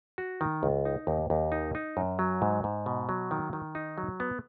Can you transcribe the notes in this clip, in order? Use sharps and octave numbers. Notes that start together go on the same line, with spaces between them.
F#4
D#3
C#2
D#4
D#2
D#2
D#4
D#4
F#2
F#3
G#2
G#2
B2
F#3
D#3
D#3
D#4
F#3
B3